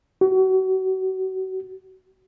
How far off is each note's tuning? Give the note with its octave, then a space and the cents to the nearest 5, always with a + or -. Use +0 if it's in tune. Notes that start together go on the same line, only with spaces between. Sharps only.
F#4 +35